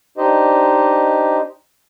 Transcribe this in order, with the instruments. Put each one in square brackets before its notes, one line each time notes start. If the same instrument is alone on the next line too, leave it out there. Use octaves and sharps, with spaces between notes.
[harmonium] D4 D#4 G4 C5 D#5